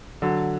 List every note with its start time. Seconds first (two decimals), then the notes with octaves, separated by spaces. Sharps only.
0.22 D3 F#3